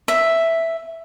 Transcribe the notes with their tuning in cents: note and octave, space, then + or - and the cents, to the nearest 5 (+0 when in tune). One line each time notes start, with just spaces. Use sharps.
E5 +0